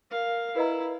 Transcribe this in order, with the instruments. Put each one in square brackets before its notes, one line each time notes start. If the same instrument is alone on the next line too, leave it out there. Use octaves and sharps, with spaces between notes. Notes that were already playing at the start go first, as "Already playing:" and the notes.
[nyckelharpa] A#4 F5
[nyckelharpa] E4 [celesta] B4 D#5 A#5